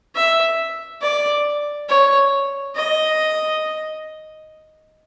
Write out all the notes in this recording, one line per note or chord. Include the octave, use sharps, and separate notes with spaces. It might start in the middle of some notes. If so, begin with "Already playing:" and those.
E5
D5
C#5
D#5